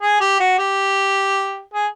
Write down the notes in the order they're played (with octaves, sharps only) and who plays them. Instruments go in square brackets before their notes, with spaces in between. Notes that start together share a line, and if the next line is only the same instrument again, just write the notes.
[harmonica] G#4
G4
F#4
G4
G#4